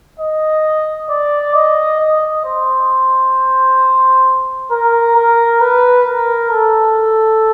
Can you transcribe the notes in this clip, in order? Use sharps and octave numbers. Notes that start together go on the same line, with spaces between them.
D#5
D5
D#5
D#5
C5
A#4
A#4
B4
A#4
A4